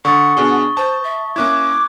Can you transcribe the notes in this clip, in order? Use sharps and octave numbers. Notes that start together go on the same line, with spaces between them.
D3 F#5 C#6 D#6 A6
B2 D4 G#4 G7
C5 A5
E5
A#3 C#4 E4 D6 F#6 G#6